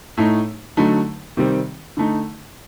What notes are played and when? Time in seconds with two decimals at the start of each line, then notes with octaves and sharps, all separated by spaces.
0.17 A2 A3 D#4
0.77 D3 F#3 A3 D#4
1.37 C3 D#3 G3 C4
1.97 D3 A3 D#4